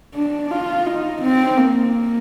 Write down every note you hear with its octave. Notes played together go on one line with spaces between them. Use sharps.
D4
F4
D#4
C4
A#3